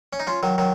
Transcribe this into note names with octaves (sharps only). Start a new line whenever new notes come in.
C#4
D#4
C#4 F4
D#3 F#3
D#3 F#3